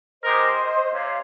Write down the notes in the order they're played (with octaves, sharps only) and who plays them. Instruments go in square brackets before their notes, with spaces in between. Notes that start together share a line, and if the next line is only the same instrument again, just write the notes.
[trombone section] G#3 D#4 G4 A#4 [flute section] C5 D#5
[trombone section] C3 [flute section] C#5 F5